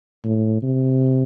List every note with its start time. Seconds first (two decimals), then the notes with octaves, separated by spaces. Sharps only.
0.25 A2
0.62 C3